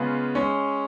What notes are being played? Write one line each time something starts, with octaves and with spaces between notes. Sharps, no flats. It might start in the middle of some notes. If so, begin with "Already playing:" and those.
Already playing: C#3 G#3 B3 F4
G#3 C#4